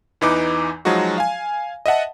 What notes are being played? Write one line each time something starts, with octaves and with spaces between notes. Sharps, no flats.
E2 E3 D#4 B4 D6
F3 F#3 G#3 D#4 F#4
F5 G#5
D#5 E5 F#5 A5